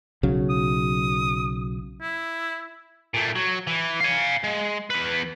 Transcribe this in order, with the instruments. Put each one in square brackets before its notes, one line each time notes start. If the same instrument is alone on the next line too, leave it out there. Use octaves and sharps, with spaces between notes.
[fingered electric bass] B1 C#3 F#3
[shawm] D#6
E4
[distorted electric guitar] A#2 A3
F#3
E3
F5 G#5
G#3
E2 B4